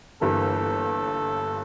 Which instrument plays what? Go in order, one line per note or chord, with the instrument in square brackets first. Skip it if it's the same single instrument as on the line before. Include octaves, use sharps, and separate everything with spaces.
[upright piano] G1 G2 E3 A#3 [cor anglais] A4